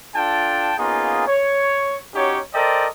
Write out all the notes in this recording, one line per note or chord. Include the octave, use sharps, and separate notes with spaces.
D4 F4 A4 G5 A5
A#3 B3 C#4 D#4 F4 G#4
C#5
C#4 D#4 F#4 G4 C#5
A4 A#4 C5 D5 D#5 G5